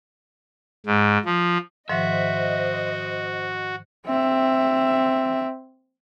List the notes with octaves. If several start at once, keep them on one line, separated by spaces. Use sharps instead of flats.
G#2
F3
G#2 D#3 F3 F#4 C5 D#5 E5
C4 E5